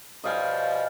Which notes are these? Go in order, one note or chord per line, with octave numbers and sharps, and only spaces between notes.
B2 F3 G3 D#5 F5 G#5